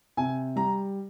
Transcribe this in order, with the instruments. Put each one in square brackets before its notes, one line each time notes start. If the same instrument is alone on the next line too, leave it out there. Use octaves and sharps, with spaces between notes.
[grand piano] C3 G#5
G3 A#5